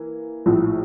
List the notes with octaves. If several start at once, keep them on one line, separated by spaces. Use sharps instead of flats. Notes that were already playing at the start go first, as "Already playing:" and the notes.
Already playing: E3 A#3
A#1 A2 F3